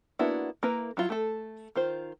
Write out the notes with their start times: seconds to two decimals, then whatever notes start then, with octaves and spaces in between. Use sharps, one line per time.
0.19 A#3 B3 D4 E4 F#4
0.63 A#3 E4 A#4 B4 A#5
0.97 F#3 E4 F4
1.10 A3 A4
1.75 D#3 F4 C5